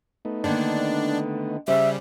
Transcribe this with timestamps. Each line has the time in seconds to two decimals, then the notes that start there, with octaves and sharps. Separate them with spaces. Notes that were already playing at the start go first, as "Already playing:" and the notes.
0.25 A3 B3 D#4
0.44 D3 D#3 A#3 D4
1.68 C#3 G3 C5 E5